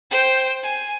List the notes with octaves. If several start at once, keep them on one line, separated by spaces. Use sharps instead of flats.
C5 G5
G#5